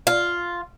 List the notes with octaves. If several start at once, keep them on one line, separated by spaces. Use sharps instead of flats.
F4